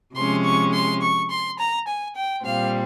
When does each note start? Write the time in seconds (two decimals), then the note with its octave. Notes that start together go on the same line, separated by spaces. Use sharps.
0.15 C3 F3 G#3 C#4 C6
0.44 C#6
0.74 C6
1.02 C#6
1.30 C6
1.59 A#5
1.88 G#5
2.16 G5
2.44 A#2 G3 C4 F5